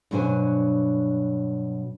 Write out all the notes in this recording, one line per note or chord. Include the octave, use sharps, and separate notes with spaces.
G2 B2 F#3 D4 C5 G#5